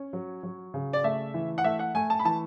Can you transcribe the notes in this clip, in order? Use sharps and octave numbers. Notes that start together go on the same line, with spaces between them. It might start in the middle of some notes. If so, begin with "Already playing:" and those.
Already playing: C#4
F#3
F#3
C#3
D5
A3 E5
E3
F#5
A3 E5
F#5
A3 G#5
A5
B5
E3 A5